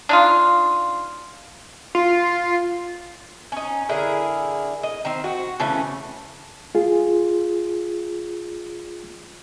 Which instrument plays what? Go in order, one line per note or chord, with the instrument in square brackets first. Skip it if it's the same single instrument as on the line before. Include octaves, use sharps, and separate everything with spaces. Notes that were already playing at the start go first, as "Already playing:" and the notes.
[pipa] D4 D#4 F4
[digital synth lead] F4
[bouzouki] C#4 D#4
D3 E4 G#4 A#4
D#5
D#3 C4
F#4
C#3 E3 A3 C#4
[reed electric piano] F4 G#4